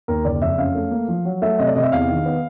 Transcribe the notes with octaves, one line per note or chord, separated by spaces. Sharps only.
D#2 A#4
F#1 D5
F2 E5
C#4 F5
A3
A#3
F3
F#3
A3 E5
C3 D#5
D5
C3 D#5
E5
E2 F5
D#3
B3